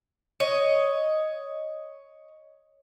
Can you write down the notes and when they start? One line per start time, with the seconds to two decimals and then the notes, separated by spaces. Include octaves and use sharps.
0.40 C#5 D#5